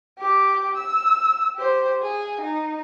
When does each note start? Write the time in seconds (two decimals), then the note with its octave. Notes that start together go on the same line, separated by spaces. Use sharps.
0.19 G4 D6
0.75 E6
1.56 G4 C5
2.02 G#4 G#5
2.41 D#4